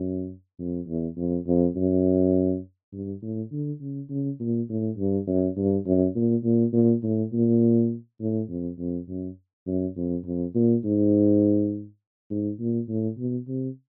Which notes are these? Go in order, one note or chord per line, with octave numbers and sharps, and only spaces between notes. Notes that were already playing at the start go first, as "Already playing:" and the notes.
Already playing: F#2
F2
E2
F2
F2
F#2
G2
A2
D3
C#3
C#3
A#2
A2
G2
F#2
G2
F#2
A#2
A#2
A#2
A2
A#2
A2
F2
F2
F#2
F#2
F2
F2
A#2
G#2
G#2
A#2
A2
B2
C3